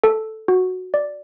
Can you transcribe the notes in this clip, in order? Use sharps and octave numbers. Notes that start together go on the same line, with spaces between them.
A4
F#4
D5